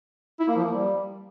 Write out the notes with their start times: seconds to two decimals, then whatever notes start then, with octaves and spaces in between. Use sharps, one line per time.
0.40 E4
0.48 A#3
0.56 F3
0.65 A#3
0.73 G3